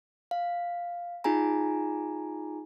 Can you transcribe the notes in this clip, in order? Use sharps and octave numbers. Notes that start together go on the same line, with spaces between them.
F5
D#4 F4 G#4 G#5 A#5